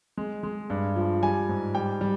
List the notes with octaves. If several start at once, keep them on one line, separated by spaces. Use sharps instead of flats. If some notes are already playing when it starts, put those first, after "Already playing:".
G#3
G#3
G2
F3
G3 G#5
G#2
G3 G5
G3